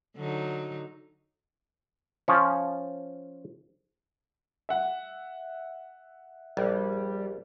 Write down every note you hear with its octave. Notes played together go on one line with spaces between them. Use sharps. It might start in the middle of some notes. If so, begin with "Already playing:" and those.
D3 F#3 D#4
F3 C#4
E5 F#5
A#1 G3